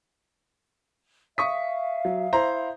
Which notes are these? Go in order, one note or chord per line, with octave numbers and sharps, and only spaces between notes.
E5 F5 C#6 D#6 B6
F#3
E4 C5 A#5